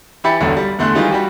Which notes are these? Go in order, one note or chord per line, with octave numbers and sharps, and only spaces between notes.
E3 E4 G4 B5 A6 C#7
E1 B1 D3
G3
E2 D3 A3 C6 F#6
D#3 E3 G3 G#3 D#4 F4
G3 F#4 G4